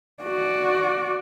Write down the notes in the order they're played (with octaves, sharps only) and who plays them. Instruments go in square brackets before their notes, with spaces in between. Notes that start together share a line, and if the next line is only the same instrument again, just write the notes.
[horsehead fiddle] F#4 D5